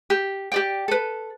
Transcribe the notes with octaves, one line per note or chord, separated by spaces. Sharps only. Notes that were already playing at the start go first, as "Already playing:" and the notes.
G4
G4 D5 G5
A4 B4